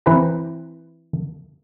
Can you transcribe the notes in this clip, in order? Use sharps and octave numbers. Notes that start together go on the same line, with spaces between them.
E3 C4 B4 C5 A#5